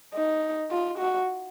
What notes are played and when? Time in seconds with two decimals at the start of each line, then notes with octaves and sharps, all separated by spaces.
0.14 D#4
0.71 F4
0.98 F#4